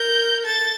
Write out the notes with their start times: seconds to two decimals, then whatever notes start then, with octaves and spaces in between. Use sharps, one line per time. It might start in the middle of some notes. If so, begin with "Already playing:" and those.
Already playing: A#4 G6
0.45 A4 A6